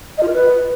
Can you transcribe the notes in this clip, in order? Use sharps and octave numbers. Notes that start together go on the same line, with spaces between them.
D#5
F4
A#4
B4